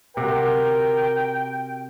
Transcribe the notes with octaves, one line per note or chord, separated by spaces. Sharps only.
C3 F#4 A#4 G5